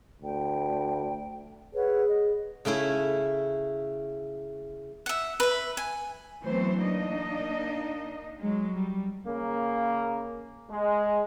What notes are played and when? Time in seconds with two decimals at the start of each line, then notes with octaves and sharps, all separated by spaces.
0.22 D2 G5
1.75 G#4 B4 C#5 F#5
2.08 D#5
2.65 C#3 A3 C#4 E4
5.06 E5 F#5
5.40 B4 E5
5.77 G#5
6.43 E3 F#3 A3 B3 C4 C5
6.81 A#3 D4 D#4 D#5
8.39 F#3 G#3
8.75 G3
9.26 C#3 A#3
10.70 G#3